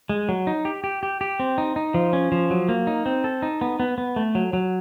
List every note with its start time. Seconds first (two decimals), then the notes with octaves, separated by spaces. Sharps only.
0.09 G#3
0.29 F#3
0.47 D#4
0.65 G4
0.84 G4
1.03 G4
1.21 G4
1.40 C4
1.58 D#4
1.76 D#4
1.94 F3
2.13 C#4
2.32 F3
2.51 F#3
2.69 A#3
2.87 D#4
3.06 C4
3.24 A4
3.42 D#4
3.61 B3
3.80 B3
3.98 B3
4.16 A3
4.35 F#3
4.53 F#3